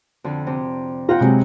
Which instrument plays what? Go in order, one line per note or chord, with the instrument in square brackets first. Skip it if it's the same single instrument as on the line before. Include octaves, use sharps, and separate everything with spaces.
[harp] F2 D3
C3 C4
[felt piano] F4 [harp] F#5 G5 A#5
[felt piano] C3 [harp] F#3 G#3 E4